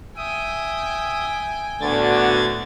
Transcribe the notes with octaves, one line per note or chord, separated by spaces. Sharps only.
E5 G5 G#5 D#6
D2 A2 D3 B3 F#4 G#6 A6